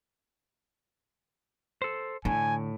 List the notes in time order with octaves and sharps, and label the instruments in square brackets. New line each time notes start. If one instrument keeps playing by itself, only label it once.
[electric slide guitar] A4 C5
[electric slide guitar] A2 [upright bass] D3 [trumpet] G#5